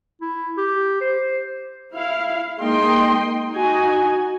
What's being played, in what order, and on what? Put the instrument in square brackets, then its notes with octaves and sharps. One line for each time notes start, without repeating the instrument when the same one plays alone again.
[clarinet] E4
G4
C5
[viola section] E4 F5
G#3 A#3 D#4 D#5 G5 C6
D#4 F#4 G#5